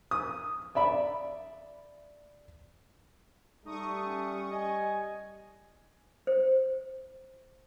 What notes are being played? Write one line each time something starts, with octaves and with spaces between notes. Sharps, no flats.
D#6
D5 E5 B5
G3 A3 D#4 C#6 D#6
C#4
D#5 G#5
C5